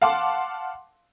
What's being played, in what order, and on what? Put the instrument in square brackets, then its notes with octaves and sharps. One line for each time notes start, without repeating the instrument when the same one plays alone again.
[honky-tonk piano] F5 F#5 A5 C6 D6